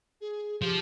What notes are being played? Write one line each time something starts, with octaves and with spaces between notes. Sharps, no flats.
G#4
F3 G4